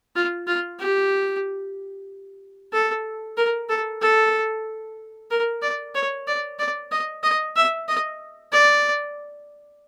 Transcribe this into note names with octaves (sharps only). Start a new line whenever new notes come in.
F4
F4
G4
A4
A#4
A4
A4
A#4
D5
C#5
D5
D5
D#5
D#5
E5
D#5
D5